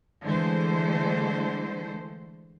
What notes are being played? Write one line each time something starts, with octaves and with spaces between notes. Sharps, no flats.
D3 E3 G#3 A3 C5